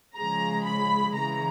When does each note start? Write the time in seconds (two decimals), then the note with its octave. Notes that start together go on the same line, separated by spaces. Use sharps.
0.15 C#3 F3 G#3 A#5
0.64 B5
1.14 C#3 E3 G#3 A#5